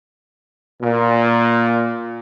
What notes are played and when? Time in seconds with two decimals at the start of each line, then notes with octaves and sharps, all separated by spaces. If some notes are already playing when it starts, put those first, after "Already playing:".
0.82 A#2